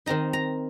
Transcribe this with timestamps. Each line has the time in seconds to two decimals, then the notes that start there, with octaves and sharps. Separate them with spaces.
0.06 D#3 C4 D#4 A#5
0.33 A#5